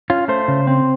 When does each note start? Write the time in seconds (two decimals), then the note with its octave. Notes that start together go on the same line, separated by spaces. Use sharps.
0.10 C#4 F4
0.28 A3 C5
0.48 C#3
0.67 C4